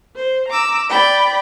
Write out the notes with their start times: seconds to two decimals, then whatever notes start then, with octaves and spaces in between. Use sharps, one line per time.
0.16 C5
0.49 A#5 D6 E6
0.89 D5 G5 B5